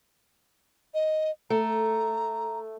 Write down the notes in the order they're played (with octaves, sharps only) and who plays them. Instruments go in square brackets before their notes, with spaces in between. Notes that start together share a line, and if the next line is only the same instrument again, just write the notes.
[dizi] D#5
[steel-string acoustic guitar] A3 [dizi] A#5